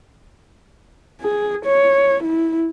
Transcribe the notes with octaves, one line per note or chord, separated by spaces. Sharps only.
G#4
C#5
E4